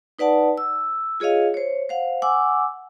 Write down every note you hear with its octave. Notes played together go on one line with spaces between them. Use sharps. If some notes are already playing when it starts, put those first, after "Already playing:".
D#4 B4 D5 F#5 A5
E6
F4 G#4 C#5 D#5 F5
C5 C#5
C5 F5 F#5
F#5 G#5 D6 E6